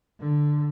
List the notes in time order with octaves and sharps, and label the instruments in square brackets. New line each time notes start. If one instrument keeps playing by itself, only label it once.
[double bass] D3